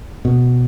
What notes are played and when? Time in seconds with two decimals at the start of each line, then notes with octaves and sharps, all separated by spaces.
0.25 B2